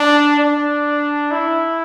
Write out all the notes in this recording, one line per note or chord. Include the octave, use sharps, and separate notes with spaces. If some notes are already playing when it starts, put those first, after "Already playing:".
Already playing: D4
D4
E4